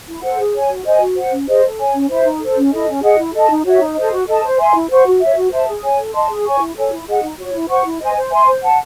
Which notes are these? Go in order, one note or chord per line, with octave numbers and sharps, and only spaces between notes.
E4
A4 C5 F#5
G#4
C#5 G#5
F#4
C5 D#5 G#5
F#4
C5 F#5
C#4
G#4 C5 D#5
A4
C#5 G#5
C#4
E4 C5 E5
D#4
A4 C5
C#4
E4 A4 D#5
C#4
G#4 D#5 F#5
E4
A4 D#5 A5
D#4
F#4 C#5 E5
D#4
A4 C5 D#5
F#4
A4 D#5 A5
C5
E5 G#5 C6
E4
C5 F#5 C#6
F#4
C#5 E5
F#4
C5 E5 A5
G#4
C#5 G#5
A4
D#5 A5 C6
G#4
C#5 G#5 C#6
E4
A4 C#5 G#5
E4
G#4 D#5 F#5
D#4
F#4 C#5
E4
C5 F#5 C#6
E4
C5 D#5 G#5
C5
E5 G#5 C6
C5
F#5 A5